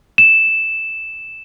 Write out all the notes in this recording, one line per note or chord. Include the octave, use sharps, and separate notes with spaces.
E7